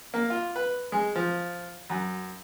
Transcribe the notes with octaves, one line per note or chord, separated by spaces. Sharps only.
A#3
F4
B4
G#3
F3
F#2